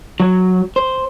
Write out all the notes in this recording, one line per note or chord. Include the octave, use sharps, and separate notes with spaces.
F#3
C5